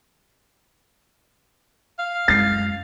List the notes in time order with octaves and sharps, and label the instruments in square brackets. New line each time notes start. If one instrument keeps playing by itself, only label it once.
[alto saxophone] F5
[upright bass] F#2 G#3 [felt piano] A6 C7